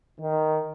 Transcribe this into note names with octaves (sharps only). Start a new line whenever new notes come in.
D#3